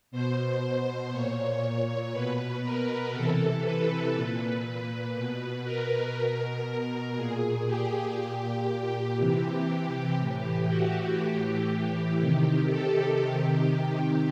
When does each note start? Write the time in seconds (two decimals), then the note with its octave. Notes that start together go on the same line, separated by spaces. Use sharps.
0.11 B2 C5
1.12 A#2 C#5
2.13 B2 B4
2.63 A#4
3.13 C3 E3 A4
3.64 B4
4.14 A#2 B4
5.15 B2
5.65 A#4
6.15 B2
7.17 A#2 G#4
7.66 G4
8.18 A#2
9.18 C3 E3 G4
10.18 A2 E3 G4
10.69 F#4
11.20 A2 E3 G4
11.69 G4
12.20 C3 D#3
12.70 A4
13.20 C3 D#3 G4
13.71 G4